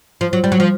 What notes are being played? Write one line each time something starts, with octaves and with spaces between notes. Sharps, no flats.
F3
F#3
G3
F#3
F3